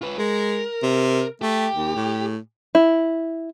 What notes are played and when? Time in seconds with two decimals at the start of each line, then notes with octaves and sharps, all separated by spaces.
0.02 F4 B4
0.18 G#3 A#4
0.83 C3
1.41 A3 G4
1.74 D#2
1.96 A2
2.75 E4